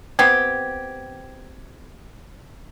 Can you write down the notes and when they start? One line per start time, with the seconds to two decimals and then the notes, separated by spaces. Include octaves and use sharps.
0.19 B3 C4 G4 G#6